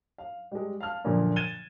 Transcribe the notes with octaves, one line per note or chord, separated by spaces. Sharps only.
F5
G3 G#3
F5 A5 F6
F#2 A#2 D3 F3 A#3
G#6 A6 D#7 E7 G7